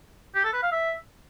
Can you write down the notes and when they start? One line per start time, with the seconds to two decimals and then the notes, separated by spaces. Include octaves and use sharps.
0.35 G4
0.44 A4
0.53 B4
0.62 F5
0.72 E5